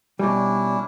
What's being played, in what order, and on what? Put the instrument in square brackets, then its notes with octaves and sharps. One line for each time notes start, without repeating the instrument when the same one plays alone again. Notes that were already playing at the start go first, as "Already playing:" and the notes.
[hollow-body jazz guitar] B2 G3 [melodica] C#4 D4 E4